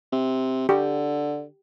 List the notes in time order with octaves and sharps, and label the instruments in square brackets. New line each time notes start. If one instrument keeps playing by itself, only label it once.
[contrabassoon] C3
[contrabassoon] D3 [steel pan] G4